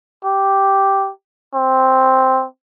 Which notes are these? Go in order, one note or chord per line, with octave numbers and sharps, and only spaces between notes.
G4
C4